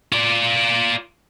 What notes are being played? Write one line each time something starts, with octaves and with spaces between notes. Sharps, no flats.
F4 D5